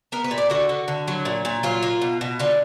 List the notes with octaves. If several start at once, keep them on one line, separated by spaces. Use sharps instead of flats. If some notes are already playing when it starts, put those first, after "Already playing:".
B3 A#4
B4
A#2
D5
D3 F#4
D3
D3
F#3
A#2
A#2
F#3 F4
A#3
B2
B2
D3 F4